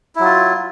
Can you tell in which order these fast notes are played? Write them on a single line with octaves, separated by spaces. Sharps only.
E4 F#3 F4